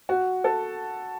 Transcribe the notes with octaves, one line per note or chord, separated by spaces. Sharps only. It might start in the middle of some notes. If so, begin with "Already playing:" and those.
F#4
A4